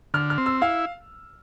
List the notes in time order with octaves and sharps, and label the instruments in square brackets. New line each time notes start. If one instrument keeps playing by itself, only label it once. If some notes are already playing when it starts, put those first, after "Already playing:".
[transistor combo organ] D3 [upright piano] F6
[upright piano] F6
[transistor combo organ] C4
[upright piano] E6
[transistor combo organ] E4 [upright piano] F5